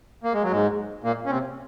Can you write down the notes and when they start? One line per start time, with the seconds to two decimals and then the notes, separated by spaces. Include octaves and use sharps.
0.24 A#3
0.33 G#3
0.43 F#3
0.51 G#2 G#3
1.04 A#2 A#3
1.26 C#4
1.30 C3 C4